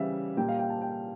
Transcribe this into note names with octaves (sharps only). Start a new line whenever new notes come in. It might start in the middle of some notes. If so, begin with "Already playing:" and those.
Already playing: C#3 E3 G3 E5 F5
A#2 G3 G5
F5
G5
A5
G5